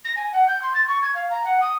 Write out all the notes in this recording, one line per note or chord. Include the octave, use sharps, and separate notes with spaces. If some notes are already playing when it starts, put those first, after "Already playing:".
A#6
G#5
F#5
G6
C6
A6
C#6
G#6
F5
A#5
F#5
D#6